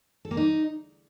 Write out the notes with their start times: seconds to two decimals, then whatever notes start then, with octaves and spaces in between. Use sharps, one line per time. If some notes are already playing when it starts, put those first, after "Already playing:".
0.25 A4
0.31 A#3
0.37 D#4